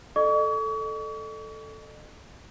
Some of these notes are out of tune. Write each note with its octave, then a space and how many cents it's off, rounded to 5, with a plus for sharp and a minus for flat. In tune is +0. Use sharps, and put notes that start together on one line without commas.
A4 +0 D#5 -45 C#6 +40